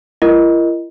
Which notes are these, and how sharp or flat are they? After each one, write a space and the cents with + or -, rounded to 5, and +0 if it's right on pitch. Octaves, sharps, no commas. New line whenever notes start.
E4 +45 A#4 +0 D#5 +0